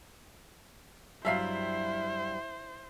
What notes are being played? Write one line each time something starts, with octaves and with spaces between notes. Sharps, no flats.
G2 F#3 G3 E4 C5 E5 F5 C7